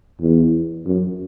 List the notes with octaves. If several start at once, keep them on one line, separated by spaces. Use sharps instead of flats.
E2
F#2